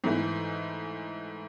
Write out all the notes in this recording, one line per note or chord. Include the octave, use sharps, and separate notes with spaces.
G#2 E3 A3